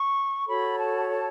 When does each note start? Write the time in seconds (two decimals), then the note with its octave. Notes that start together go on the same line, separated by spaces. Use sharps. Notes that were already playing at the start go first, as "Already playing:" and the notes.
Already playing: C#6
0.47 F#4 A4 C#5 B5
0.78 A5
1.09 A5